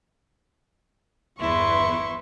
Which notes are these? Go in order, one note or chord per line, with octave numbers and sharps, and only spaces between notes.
G1 E2 E4 B4 C6 C#6